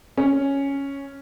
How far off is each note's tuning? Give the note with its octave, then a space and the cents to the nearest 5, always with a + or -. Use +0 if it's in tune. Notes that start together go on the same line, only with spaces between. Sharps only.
C#4 +0